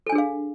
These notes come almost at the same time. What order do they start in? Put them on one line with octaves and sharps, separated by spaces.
A4 G#5 D4 G#4 F5